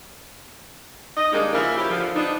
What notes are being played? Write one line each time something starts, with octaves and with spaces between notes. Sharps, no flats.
D#5
D#3 G3 G#3 A#3 D4 D#4
C#3 F3 A#3 E4 F4 A#4
G3 C#4 E4 G4
D3 F3
B3 D4 D#4